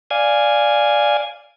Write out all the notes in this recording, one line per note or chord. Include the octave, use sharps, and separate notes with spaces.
D5 F5 G#5 G#6